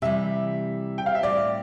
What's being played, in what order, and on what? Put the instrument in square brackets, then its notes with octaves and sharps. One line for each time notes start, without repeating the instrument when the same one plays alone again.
[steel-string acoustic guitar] C3 E3 G3 [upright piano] E5
[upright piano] G5
F5
E5
[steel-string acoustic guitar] A2 G3 C4 G4 [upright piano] D5